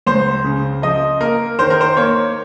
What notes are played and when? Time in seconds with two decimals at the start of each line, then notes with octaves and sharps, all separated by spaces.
0.07 C#2 C5
0.44 C#3
0.82 F3 D#5
1.20 A#3 A#4
1.59 D#3 C5
1.70 A#4
1.81 C5
1.97 A#3 C#5